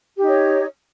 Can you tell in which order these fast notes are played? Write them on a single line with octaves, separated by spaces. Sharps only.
G4 D#4 D#5 C#5